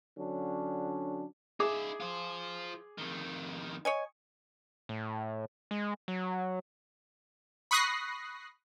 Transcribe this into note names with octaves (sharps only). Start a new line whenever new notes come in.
D3 F#3 C#4 D4
D#4 G#4 E5 D6
F4 C5
F2 D#3
C#5 D#5 G#5
A2
G#3
F#3
B5 C#6 D#6 F#6 A#6 C7